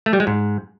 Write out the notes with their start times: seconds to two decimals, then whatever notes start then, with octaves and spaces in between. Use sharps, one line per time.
0.06 A3
0.13 G3
0.20 G#3
0.27 G#2